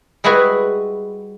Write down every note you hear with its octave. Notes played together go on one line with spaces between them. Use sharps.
G3 G#3 E4 F#4 G#4 B4